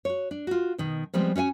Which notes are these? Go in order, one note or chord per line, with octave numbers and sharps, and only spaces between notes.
F#4 C#5
D4
F4 F#4
B2 D#3
F3 G3 G#3 B3 C4
C#4 F#4 F5 G#5